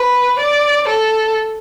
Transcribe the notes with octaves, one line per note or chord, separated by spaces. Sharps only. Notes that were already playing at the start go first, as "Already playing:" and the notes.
Already playing: B4
D5
A4